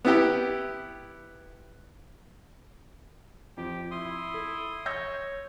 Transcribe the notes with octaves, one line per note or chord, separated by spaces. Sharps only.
B3 E4 G4 G5
F2 G4
E4 C6 D#6
A4
C#5 E6 G6 A#6